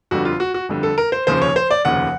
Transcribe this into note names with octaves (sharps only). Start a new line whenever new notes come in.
G1 F2 D3 G3 F#4
F4
F#4
F#4
G1 F2 D3 G3
A4
A#4
C5
F1 D#2 C#3 F3 C5
C#5
C5
D5
F1 D#2 C#3 F3 F#5